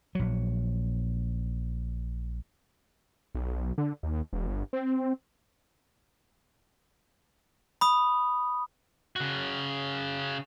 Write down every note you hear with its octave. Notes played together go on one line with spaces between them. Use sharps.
A#1 F#3
B1
D3
D#2
E1
G1
C4
B5 D#6
C#3 F#4